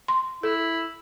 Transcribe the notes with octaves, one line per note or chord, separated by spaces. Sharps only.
C6
E4 A4